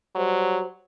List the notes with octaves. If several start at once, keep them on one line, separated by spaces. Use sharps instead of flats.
F#3 G3 C5